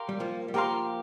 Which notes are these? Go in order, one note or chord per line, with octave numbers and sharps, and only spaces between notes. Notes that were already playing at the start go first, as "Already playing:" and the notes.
Already playing: G4 A#4 F5 C6
G3
F3 A#3
G3
F3 A#3 G4 A#4 F5 C6